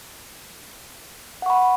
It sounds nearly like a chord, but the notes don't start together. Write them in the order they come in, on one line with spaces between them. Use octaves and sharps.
F#5 C#6 B5